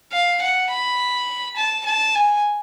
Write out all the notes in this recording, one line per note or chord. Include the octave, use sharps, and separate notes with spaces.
F5
F#5
B5
A5
A5
G#5